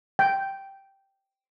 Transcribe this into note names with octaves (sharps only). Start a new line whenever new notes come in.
G5